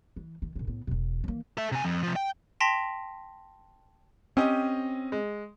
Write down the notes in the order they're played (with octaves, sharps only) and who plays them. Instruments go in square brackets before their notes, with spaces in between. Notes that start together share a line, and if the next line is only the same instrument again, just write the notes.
[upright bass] E3
D#3
A#1 D3
A2 B3
E1 B2
E3 A#3
[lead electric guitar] A4 E5
C3 G#5
F2
C3 F3
G5
[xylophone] G5 A5 C6 A#6 B6 F7
[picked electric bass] C4 [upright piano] C#4 G4 D#5
[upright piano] G#3